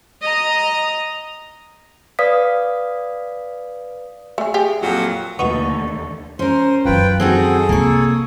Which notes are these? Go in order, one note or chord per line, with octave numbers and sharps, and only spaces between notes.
D#5 A#5
B4 D5 F5 D#6 B6
A3 G#4
G4 G#4
F2 A#2 F#3
D#2 D3 A3 B3 D#4 F#4 C#6
C#4 A#4 C5
F#2 D#3 F4 B4 G5
C4 D#4 F#4 G#4 A4
C2 A#3 C#5